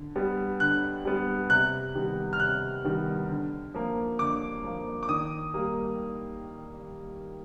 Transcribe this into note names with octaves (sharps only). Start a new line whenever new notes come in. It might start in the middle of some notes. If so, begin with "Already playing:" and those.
Already playing: D3
G3 B3
D3 F#6
G3 B3
C3 F#6
D#3 G3 B3
F6
C3 F#6
D#3 G3 B3
D3
F3 A#3
D3 D6
F3 A#3
D6
D#3 D#6
G3 A#3